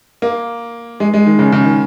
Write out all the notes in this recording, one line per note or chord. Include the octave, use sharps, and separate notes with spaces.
A#3
G#3
G#3
D#3
C#3
C#3
D#3